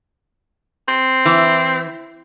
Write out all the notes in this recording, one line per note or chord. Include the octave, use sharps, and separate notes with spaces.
C4
E3